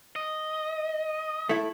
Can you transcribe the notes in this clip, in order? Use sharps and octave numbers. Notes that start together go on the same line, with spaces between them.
D#5
A3 E4